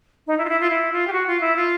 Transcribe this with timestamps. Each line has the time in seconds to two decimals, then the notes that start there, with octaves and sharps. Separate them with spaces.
0.27 D#4
0.38 E4
0.45 F4
0.49 E4
0.60 F4
0.70 E4
0.92 F4
1.07 G4
1.13 F#4
1.27 F4
1.41 E4
1.56 F4